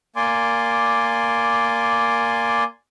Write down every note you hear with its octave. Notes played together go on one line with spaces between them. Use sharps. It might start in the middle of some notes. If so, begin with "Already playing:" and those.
A#3 D5 G#5 C6 D6